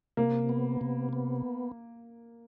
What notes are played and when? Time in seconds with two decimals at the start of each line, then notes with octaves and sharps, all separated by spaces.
0.17 C3 A#3
0.49 B3
0.81 C3
1.13 B3